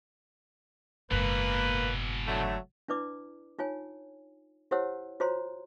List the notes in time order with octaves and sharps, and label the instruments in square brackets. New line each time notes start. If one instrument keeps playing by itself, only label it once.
[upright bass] F#1 G#2 [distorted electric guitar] B2 E3 [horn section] A#3 B4
[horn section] D3 F#3 A3
[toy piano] D4 E4 B4 D5 D6
D#4 F4 C#5 G#5
E4 G4 C5 C#5 F#5 E6
F4 F#4 C5 C#5 A#5 C6